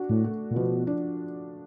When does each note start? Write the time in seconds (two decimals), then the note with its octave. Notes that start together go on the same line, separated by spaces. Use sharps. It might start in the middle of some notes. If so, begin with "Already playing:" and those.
Already playing: D4 F#4
0.09 A2
0.24 A3
0.51 A#2
0.56 B2 F3
0.87 D4